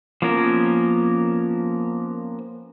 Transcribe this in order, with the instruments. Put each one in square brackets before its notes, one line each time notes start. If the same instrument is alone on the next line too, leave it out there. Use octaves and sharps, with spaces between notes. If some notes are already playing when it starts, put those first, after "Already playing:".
[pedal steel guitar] F3 A#3 B3 C#4 A#4